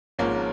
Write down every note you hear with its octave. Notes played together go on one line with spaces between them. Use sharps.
G#1 G#2 F3 A#3 C#4